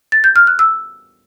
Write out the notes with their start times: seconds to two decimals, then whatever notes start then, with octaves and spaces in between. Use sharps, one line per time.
0.12 A6
0.24 G6
0.36 F6
0.47 F#6
0.59 E6